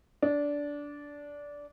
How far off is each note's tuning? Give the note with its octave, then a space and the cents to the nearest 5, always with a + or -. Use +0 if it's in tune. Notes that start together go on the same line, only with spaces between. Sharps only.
D4 -15